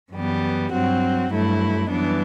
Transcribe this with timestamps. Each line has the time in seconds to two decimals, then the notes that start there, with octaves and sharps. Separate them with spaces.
0.12 F#2 E3 G3 B3
0.71 G2 F#3 C4 F#4
1.31 G2 F#3 A3 E4
1.90 F#2 E3 G3 B3 D4